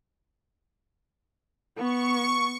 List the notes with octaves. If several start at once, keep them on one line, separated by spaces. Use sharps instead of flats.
B3 C#6